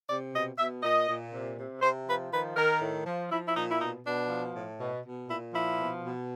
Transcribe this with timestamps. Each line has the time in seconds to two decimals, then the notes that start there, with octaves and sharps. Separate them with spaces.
0.08 C3 D5
0.33 B2 D#5
0.58 B2 E5
0.83 A#2 D#5
1.07 A#2
1.32 C3
1.57 C3
1.82 C3 C5
2.07 F3 B4
2.31 D#3 B4
2.56 D#3 A#4
2.80 A2
3.06 F3
3.30 F3 E4
3.45 E4
3.55 A#2 D#4
3.69 E4
3.80 B2 D#4
4.05 B2 D4
4.29 F3
4.54 A2
4.79 B2
5.03 B2
5.28 A#2 E4
5.53 F3 E4
5.78 B2
6.03 B2